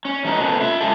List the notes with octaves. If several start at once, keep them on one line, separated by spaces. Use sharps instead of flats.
C#4
E3 A3 D#4 F#4 A#5
C3 A3 B3 C#4
F4 E5
C#3 G#3 C#4 F4 G4 A4